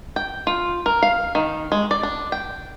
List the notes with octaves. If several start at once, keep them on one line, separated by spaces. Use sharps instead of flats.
G5
F4
A#4
F5
D#3
G#3
D5
D4
G5